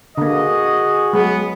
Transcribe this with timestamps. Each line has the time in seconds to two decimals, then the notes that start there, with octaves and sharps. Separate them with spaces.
0.18 D3 A#3 F#4 G#4 D#5
1.13 F#3 G#3 B3